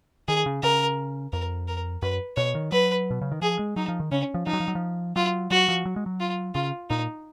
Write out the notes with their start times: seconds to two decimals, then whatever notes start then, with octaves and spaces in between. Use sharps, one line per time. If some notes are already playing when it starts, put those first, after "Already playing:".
0.28 D#3 G#4
0.46 C#3
0.63 C#3 A#4
1.33 F2 A#4
1.68 A#4
2.02 F#2 B4
2.37 B2 C#5
2.55 D#3
2.72 F#3 B4
3.11 B2
3.21 C#3
3.32 D#3
3.42 F3 G#4
3.59 G#3
3.76 F#3 D#4
3.88 F3
4.00 D#3
4.12 C#3 C#4
4.34 F3
4.47 F3 D#4
4.53 F#3
4.60 F3
4.68 F#3
4.75 F3
5.16 F#3 F4
5.51 F#3 F#4
5.68 F3
5.86 F#3
5.96 G#3
6.06 F#3
6.20 F4
6.55 C#3 F4
6.90 A#2 D#4